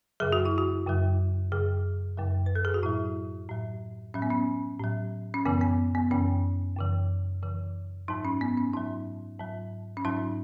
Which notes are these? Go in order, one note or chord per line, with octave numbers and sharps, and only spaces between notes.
F#2 C#3 F#3 G#4
F#4
E4
F#4
F#2 C#3 F#3
F#2 C#3 F#3 G#4
F#2 C#3 F#3
B4
A4
G#4
F#4
A2 F#3 E4
A2 F#3
A2 F#3 C#4
B3
C#4
A2 F#3
C#4
F#2 C#3 E3 B3
B3
B3
F#2 C#3 E3 C#4
F#2 C#3 E3
F#2 C#3 E3
G#2 F#3 D#4
C#4
B3
C#4
G#2 F#3 D#4
G#2 F#3
C#4
G#2 F#3 D#4